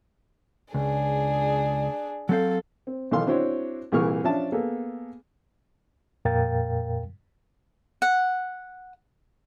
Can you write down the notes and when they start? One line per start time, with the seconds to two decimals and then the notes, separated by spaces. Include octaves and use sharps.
0.74 C#2 D4 G#4
2.29 F#3 C4 A4 F5
2.87 C4
3.11 B1 D#3 E3 A4 F5 C6
3.27 C4 D4 E4 F#4 C5 C#5
3.92 C2 A#2 E3 G#4 C#6 F6
4.24 F3 C#4 D4 E5 A5
4.52 A#3 B3 G#4 A4
6.25 F2 A#2 A#4 F5 G5 A6
8.02 F#5